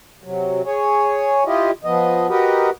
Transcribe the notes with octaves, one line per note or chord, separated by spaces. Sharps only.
C3 F#3
G#4 C#5
E4 F4 G4 D#5
F3 B3 D#5
F#4 G4 A#4 B4 D#5